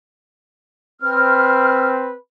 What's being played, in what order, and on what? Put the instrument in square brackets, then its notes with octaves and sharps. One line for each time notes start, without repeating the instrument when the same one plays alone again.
[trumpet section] C4 B4 [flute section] F6